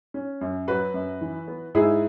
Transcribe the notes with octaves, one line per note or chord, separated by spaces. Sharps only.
C#4
F#2
F#3 F#4 B4
F#2
E3
B3
G#2 E4 G#4